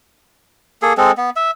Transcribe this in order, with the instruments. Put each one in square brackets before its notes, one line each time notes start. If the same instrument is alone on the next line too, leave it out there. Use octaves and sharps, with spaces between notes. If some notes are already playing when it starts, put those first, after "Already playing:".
[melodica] A#3 G#4 A4
G#3 C4 A4
B3
E5